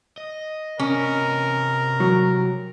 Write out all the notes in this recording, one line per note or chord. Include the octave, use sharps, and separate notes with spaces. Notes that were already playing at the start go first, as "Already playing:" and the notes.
D#5
C3 C#4 A#4 D#5
F#3